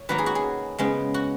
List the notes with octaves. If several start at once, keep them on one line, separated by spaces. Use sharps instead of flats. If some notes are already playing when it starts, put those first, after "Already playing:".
Already playing: C#5
D#3 F#3 A#3 D#4 B4
G#4
F#4
G#4
C#3 G#3 B3
F#4